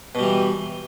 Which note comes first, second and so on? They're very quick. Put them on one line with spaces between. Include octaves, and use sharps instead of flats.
B2 G3 E3